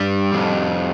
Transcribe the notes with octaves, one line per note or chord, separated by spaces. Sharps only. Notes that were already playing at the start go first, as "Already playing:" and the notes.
Already playing: G2 G3
F2